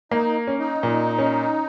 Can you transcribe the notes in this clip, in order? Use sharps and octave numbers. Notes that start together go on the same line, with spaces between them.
A#3 D#4
C#4
D#4
A#2
C#4